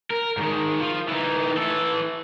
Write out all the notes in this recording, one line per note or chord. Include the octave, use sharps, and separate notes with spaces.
A#4
G#2 D#3
F3
E3 D#4
E3 A4